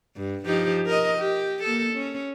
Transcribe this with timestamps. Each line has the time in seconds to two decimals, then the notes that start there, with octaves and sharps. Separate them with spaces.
0.16 G2
0.46 F3 D#4 G4
0.86 A#4 D#5
1.18 G4
1.64 A#3 A4
1.93 C#4